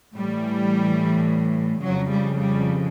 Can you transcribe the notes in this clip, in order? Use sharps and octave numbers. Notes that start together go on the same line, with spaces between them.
A2 E3 G3
F2 C#3 F3 F#3
G3
G3